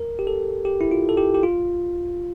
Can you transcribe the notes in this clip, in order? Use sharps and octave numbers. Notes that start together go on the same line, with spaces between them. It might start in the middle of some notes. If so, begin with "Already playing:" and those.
Already playing: A#4
G4
A4
G4
E4
F4
A4
G4
G4
F4